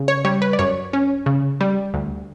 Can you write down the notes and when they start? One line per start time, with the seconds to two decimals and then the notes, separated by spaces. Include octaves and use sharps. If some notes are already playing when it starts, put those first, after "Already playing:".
Already playing: C#3
0.08 C#5
0.25 G3 C#5
0.42 B4
0.53 D5
0.59 F#2 C#5
0.93 C#4
1.26 C#3
1.61 G3
1.94 D2